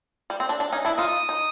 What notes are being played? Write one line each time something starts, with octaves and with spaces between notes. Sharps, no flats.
G3
C4
D4
D4
C#4 D#4
D4 E4
D#4 F4 D#6
D#4